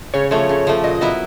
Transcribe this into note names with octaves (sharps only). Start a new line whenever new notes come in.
C#3 C#5
F3 A3 C#5
C#3
F3 A3
A#2 D#5
F#3 B3 E4